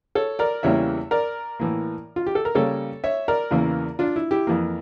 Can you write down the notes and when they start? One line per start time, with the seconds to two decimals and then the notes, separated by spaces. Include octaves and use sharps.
0.15 A4 C#5
0.39 A#4 D5
0.63 E2 C#3 E3 G3 A#3 C#5 E5
1.11 A#4 D5
1.60 A2 E3 A#3
2.16 F4
2.27 G4
2.35 A4
2.45 A#4
2.55 C#3 G3 A#3 A4 C#5
3.04 C#5 E5
3.28 A#4 D5
3.51 E2 C#3 E3 A#3
3.99 D4 F4
4.16 E4
4.31 E4 G4
4.47 F2 E3 A#3